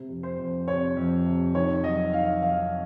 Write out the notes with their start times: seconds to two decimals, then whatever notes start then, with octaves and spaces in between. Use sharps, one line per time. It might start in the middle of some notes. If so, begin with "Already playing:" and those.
Already playing: C3
0.09 F2
0.23 C5
0.38 F2
0.67 C3 C#5
0.96 F2
1.26 C3
1.55 D#3 C#5
1.84 F#3 D#5
2.13 D#3 F5
2.42 F#3 F5